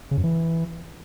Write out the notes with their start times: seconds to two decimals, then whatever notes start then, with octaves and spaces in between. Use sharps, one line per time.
0.11 C#3
0.17 F#2
0.24 E3